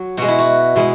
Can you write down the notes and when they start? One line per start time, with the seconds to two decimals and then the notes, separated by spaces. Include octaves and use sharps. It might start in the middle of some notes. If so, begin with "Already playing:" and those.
Already playing: F#3
0.17 B2 G#3 F#4
0.28 E4
0.38 F#4
0.75 B2 G#3 E4